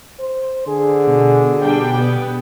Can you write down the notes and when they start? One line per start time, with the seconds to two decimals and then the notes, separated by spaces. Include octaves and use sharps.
0.20 C5
0.68 D3 G#4
1.07 B2
1.61 G3 D4 G5
1.99 B3